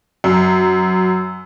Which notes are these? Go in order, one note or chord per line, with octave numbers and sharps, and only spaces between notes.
F#2